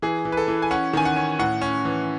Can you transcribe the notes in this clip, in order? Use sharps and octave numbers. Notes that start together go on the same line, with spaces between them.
E3 G#4
E3
B4
A4
E3
G#5
C#4 F#5
D#3 G#5
F#5
C#4
A2 F#5
C#4
E3